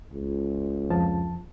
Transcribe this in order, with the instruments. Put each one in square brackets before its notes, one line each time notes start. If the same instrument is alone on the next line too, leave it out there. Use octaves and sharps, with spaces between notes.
[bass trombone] C#2
[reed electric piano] F2 F3 A5